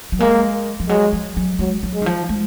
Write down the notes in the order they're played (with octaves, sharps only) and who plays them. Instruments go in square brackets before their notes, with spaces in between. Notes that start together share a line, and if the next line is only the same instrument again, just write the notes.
[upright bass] F#3
[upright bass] G#3 [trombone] A#3
[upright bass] F3
[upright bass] F#3 [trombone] G#3
[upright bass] F3
F#3
[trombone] F#3 [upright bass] G#3
[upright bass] F#3
[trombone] G#3
[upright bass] D#3
F3
G#3